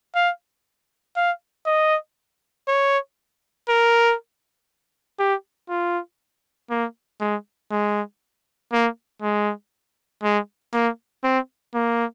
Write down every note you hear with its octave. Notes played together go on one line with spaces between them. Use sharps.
F5
F5
D#5
C#5
A#4
G4
F4
A#3
G#3
G#3
A#3
G#3
G#3
A#3
C4
A#3